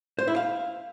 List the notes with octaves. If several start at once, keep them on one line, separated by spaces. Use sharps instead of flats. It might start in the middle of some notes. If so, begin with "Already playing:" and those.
C5
E4
F5